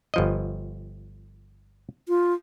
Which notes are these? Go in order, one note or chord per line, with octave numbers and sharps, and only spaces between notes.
G1 F3 D#5
F4